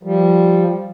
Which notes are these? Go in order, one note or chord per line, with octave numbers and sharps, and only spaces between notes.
F3 G3